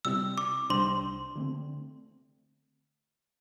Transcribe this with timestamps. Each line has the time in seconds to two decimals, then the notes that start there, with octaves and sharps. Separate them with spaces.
0.05 C3 G3 C4 E4 E6
0.38 D6
0.70 C2 C3 G3 D4 C5 C6
1.36 D3 A3 C4